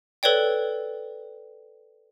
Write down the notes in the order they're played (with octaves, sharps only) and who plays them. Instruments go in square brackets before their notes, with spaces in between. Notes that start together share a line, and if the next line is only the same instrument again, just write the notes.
[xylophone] A4 B4 C#5 D5 G5